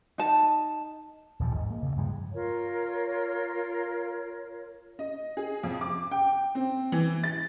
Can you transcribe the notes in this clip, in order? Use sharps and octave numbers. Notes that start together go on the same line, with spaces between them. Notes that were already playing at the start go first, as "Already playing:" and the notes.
D#4 A5
A#1 D#2 A#2 F3
G#2
A#3
D2 C#3
G2 F3 G3 G#3
F4 A#4 C#5
D#5
G#4
F2
D6
G5
C4
E3
A6